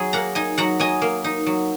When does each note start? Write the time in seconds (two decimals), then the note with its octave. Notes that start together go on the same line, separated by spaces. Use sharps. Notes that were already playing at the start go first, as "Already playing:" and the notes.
Already playing: F#3 G#4
0.13 A#3 F#5 A#5
0.35 D#4 D#5 G#5
0.58 F#3 F#5 A#5
0.80 F#3 D#5 G#5
1.02 A#3
1.24 D#4
1.47 F#3